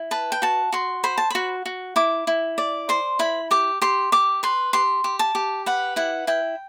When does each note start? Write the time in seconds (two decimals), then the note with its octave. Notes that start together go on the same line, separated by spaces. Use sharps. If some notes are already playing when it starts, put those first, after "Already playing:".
Already playing: E4
0.11 B4 A5
0.32 G5
0.42 F#4 A5
0.72 F#4 C6
1.04 C5 B5
1.18 A5
1.30 F#4 B5
1.66 F#4
1.96 E4 D6
2.27 E4
2.58 D5
2.89 C5 C6
3.19 E4 B5
3.51 G4 D6
3.82 G4 C6
4.12 G4 D6
4.43 B4 C6
4.73 G4 C6
5.04 G4
5.19 A5
5.35 G4
5.66 B4 F#5
5.96 E4 F#5
6.27 E4 G5